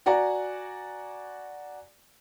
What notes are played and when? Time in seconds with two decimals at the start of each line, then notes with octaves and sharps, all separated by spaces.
0.06 F#4 D5 F#5 G#5 A#5